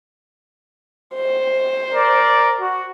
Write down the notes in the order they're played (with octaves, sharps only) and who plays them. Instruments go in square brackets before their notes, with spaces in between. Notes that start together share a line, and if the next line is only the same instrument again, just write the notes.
[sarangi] C5
[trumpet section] A#4 D5
F#4